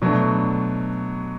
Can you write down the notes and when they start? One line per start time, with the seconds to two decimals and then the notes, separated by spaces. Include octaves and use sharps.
0.02 B2 F#3 A3 D4